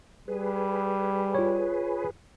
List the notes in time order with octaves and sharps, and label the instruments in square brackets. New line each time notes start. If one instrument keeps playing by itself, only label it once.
[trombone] G3 [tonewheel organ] G#4 B4
[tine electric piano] F4 C#5